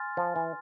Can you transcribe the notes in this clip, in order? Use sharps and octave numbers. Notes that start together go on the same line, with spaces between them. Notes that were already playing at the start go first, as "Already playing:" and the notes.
Already playing: G#5 C6 F6 A6
F3
E3